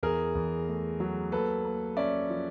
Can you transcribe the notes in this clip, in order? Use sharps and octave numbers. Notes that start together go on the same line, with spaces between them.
E2 G#4 A#4
E2
A3
F#3
A#3 A4 B4
A#3
C#4 D5 E5
F3